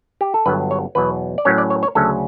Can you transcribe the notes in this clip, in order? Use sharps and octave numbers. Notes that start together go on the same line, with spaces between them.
G4
A4
G1 G2 F#3 B3 B4
C#5
E2 B2 F#3 B4
D5
A2 F#3 C#4 C#5
D5
C#5
C#5
D2 C#3 F#3 C#4 A4